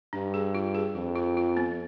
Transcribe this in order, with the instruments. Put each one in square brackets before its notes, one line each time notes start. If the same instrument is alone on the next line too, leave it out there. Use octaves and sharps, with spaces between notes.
[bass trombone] G2 [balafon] D4
[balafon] G#4
F4
G#4
[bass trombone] F2 [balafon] F4
[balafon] F4
F4
B3